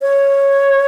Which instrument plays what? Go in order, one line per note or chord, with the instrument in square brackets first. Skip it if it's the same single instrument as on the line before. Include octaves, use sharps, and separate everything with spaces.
[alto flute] C#5